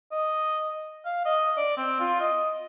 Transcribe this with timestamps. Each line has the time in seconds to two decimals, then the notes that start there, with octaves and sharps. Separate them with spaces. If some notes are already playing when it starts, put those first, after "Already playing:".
0.12 D#5
1.05 F5
1.25 D#5
1.57 D5
1.77 C4
2.00 F4
2.20 D#5